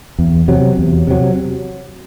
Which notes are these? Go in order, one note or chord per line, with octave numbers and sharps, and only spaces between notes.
E2
C3 F#3
E2
C3 F#3